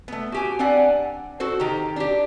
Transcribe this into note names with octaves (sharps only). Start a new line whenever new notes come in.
A3 B3
F#4 G4 G#5
C4 D4 D5 F#5 G#5
F#4 A4 C5
D#3 G4 A#5
D4 G4